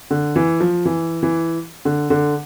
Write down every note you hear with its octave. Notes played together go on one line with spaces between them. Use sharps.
D3
E3
F3
E3
E3
D3
D3